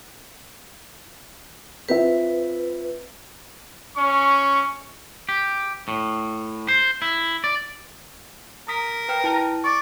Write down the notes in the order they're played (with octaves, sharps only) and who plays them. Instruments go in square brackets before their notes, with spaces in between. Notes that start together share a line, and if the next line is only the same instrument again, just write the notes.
[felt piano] C4 F4 E5 [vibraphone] B4
[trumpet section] C#4 C#6
[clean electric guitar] G4
A2
C5
E4
D5
[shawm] A#4 [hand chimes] D#6 B6
[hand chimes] B4 G5 F6
E4 A5
[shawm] D5 [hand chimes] C#6 D6